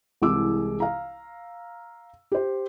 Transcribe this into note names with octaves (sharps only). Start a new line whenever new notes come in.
C2 E3 G#3 G#4 D6 E6
F5 A#5
G4 C5